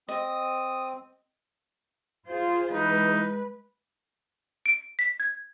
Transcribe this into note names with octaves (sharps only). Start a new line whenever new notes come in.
C4 D#5 D#6
F4 G#4 C5
E3 G#3 D#4 B4
D7
B6
G#6